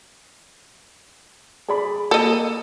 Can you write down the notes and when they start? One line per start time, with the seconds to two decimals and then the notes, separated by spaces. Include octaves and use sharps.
1.68 G#4 D5 B5
2.11 A#3 A4 D#5